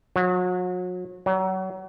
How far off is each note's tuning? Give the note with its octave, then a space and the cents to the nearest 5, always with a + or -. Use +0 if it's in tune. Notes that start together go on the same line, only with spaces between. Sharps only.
F#3 -35
F#3 +30